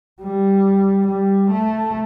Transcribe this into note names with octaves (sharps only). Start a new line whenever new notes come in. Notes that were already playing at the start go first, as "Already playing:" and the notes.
G3
G3
A3